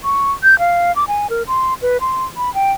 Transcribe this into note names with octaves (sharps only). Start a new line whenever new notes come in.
C#6
G6
F5
D6
G#5
A#4
C6
B4
C6
B5
G5